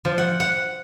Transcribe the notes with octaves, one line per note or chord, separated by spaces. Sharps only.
F3
F#5
F#5